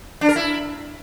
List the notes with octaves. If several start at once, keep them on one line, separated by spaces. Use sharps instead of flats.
D4
A#4
E4